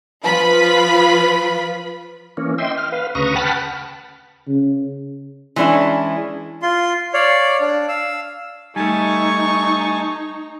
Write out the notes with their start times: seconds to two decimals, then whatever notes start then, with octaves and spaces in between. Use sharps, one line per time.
0.24 F3 F4 B4 B5
2.37 E3 A#3 C#4
2.58 D#5 E5 G5 C6
2.78 F6
2.92 B4 F5
3.15 D2 C#3 B4 A#5 C#6 D#6
3.36 F#5 G5 A5 B5 F6 F#6
4.48 C#3
5.56 E3 G#3 C#4 D4 E4
6.62 F4 C6
7.14 C#5 D5 F5
7.61 D4
7.88 F5 E6
8.76 G3 A3 D#4 G#5 A5 C#6